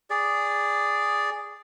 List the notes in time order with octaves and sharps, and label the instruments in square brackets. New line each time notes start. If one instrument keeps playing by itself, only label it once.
[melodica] G#4 D5